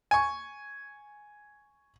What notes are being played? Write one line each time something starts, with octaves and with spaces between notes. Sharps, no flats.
G#5 C#6